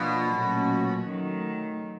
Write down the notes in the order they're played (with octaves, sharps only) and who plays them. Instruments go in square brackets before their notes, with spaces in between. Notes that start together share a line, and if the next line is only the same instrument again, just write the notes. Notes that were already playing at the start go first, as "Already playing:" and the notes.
Already playing: [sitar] B2 [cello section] F3 A#3 D4 F4
[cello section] A#2 F#3 A3 C#4 F#4
D#3 F#3 A3